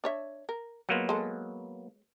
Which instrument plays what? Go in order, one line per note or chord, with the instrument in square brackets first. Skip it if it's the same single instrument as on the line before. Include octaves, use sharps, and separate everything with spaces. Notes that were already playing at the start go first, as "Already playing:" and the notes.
[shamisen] D4 C#5 E5
A#4
[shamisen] F3 G#3 [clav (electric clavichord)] F#3 A#3 B3
[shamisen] G#3 A4